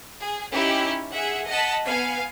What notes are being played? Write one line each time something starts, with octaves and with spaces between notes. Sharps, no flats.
G#4
C#4 D#4 E4 G4
G#4 E5 F#5
D#5 F#5 A5 B6
B3 F5 G#5